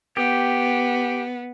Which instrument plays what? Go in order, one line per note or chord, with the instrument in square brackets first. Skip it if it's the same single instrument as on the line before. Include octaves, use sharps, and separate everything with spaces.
[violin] B3 [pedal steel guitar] G4